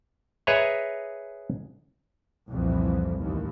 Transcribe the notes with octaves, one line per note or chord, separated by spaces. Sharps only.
G#4 B4 C#5 D#5 E5 A#5
C2 F2 A#2 E3
A1 D#2